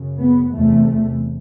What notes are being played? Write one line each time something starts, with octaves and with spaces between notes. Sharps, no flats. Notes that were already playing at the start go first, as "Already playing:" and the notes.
Already playing: F#2 C#3
B3
E2 C3 A3